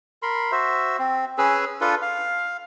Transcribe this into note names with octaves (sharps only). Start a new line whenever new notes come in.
A#4 B5 C6
F#4 C5 E5
C4
C#4 G#4 B4 E6
D4 F4 A4 B4
F5